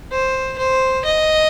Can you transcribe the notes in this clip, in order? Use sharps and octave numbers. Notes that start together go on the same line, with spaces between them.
C5
C5
D#5